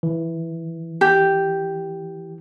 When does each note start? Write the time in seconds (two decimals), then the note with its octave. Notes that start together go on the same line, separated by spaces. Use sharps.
0.03 E3
1.01 G4